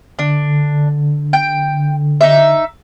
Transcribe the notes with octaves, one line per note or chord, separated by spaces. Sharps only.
D3 D4
G5
D#4 E5